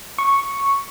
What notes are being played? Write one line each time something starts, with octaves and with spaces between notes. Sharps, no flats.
C#6